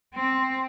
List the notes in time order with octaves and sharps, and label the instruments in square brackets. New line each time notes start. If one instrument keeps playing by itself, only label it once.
[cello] C4